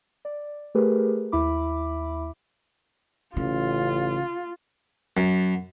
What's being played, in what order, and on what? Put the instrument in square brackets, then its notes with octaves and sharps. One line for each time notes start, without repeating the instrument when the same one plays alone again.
[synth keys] D5
A3 G4 G#4 A#4 B4
D#2 E4 E5 B5 D6
[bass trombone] A1 [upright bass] C#3 [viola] F4
[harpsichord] F#2